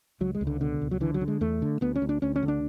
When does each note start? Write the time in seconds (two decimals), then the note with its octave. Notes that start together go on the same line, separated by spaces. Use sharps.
0.21 C#2 F#3
0.35 G#3
0.41 C#2
0.47 D3
0.61 B2 D3
0.82 C#2
0.91 F#3
1.01 D3 E3
1.14 F#3
1.21 D3
1.28 G#3
1.41 E2 A3
1.62 D3
1.81 D2 B3
1.96 C#4
2.02 D2
2.09 D4
2.22 D2 C#4
2.36 C#4
2.43 D3
2.48 D4